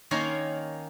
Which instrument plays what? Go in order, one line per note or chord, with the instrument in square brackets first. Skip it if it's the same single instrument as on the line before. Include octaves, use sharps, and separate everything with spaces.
[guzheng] D#3 A#3 C#4 A#4 C#5 C6